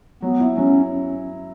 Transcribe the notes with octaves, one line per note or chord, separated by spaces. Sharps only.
F#3 B3
E4
F#3 C#4